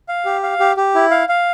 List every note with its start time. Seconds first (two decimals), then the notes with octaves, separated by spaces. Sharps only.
0.09 F5
0.25 G4
0.43 F5
0.60 G4
0.77 G4
0.95 E4
1.11 F5
1.29 F5